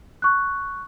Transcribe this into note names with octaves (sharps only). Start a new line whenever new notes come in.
C#6 F#6